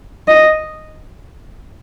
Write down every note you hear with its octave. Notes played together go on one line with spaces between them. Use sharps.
D#5